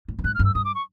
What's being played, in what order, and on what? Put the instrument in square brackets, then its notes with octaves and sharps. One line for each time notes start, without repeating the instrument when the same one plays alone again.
[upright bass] A2
G2
[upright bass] G#2 [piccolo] F#6
[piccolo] F6
[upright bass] G2
[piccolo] E6
[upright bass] G2 [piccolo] D#6
[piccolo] D6
C#6